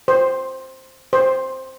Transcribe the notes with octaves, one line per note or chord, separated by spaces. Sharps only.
C5
C5